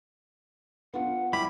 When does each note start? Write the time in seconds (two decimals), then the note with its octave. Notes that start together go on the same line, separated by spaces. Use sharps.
0.94 B3 D4 F4 F#5
1.33 G3 E4 G4 B5